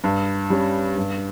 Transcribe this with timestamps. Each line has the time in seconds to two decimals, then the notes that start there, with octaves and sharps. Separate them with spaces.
0.04 G2
0.50 G3 C#4
0.97 G2